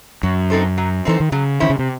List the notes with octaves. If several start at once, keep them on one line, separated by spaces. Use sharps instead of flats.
F#2 F#3
C4 D#4 A4 C5
F#3
E3 C4 D#4 A4 C5
D#3
C#3 F#3
D#3 C#4 E4 C5
C#3
C3